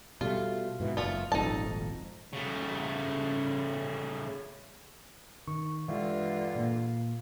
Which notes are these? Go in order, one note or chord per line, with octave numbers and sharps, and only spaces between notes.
B2 G3 A3 F4
G#2 B2 E3
F#1 A3 F4
D#1 G#1 F2 D#4 A5
C#3 A3
D#3 C#6
G2 D3 E3 G#3 F4 E5
A#2 A#3